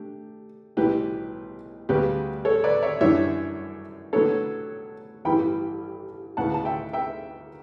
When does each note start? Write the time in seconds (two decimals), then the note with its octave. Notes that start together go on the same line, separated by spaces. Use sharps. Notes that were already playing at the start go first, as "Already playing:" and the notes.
Already playing: A3 D4 G4
0.77 B1 A2 E3 G3 G4 B4
1.89 D2 C#3 G3 B3 G4 B4
2.45 A4 C#5
2.64 B4 D5
2.83 C#5 E5
3.01 F#2 E3 G3 D4 C#5 E5
4.13 A2 F#3 B3 D4 A4 C#5
5.25 A1 G2 E3 B3 E4 G5 B5
6.37 D2 C#3 E3 B3 F#5 A5
6.54 A5
6.65 E5 G5
6.93 E5 G5